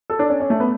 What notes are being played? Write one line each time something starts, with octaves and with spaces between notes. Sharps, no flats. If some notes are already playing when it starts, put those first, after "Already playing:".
A4
D4
C#4
C#4
A3
B3